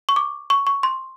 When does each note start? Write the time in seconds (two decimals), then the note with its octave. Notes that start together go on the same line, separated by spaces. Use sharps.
0.09 C#6
0.16 D6
0.50 C#6
0.67 C#6
0.83 C6